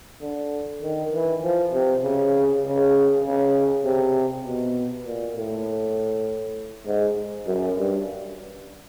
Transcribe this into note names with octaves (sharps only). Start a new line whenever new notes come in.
D3
D#3
E3
F3
C3
C#3
C#3
C#3
C3
B2
A#2
A2
G#2
F#2
G2